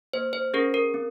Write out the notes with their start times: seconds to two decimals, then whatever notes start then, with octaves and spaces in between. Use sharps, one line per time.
0.13 A#3 C5
0.33 C5
0.53 C#4 G#4 A#4
0.74 A#4
0.94 C4